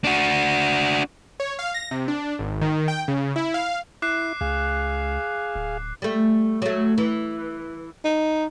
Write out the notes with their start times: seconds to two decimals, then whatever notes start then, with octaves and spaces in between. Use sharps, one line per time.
0.04 D4 F#4
1.40 C#5
1.59 F5
1.74 A#6
1.91 C3
2.08 D4
2.39 G#1
2.61 D#3
2.88 G5
3.08 C#3
3.36 E4
3.54 F5
4.02 E4 D6 F#6 C7
4.41 C#2 G#4 F5
5.55 D1
6.02 G3 A3
6.62 F#3 A3
6.98 E3
8.05 D#4